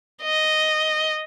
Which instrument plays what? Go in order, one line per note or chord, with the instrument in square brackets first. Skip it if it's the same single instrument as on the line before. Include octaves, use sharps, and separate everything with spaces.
[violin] D#5